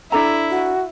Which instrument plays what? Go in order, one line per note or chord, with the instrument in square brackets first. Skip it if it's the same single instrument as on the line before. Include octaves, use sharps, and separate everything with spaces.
[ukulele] D4 A4 A#5 [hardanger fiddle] E4
[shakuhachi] F#4